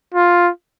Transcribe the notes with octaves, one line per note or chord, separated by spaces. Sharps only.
F4